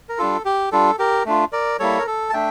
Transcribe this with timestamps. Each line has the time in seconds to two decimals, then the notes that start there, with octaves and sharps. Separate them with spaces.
0.09 A#4
0.18 G3 D4 F4 A4
0.45 G4
0.72 G3 D4 F4 A4
0.99 G4 A#4
1.26 A3 D4 F4
1.52 A#4 D5
1.79 G3 A#3 E4 A4 C#5
1.99 A#4
2.07 A4
2.30 A5
2.33 A3 D4 E5 G5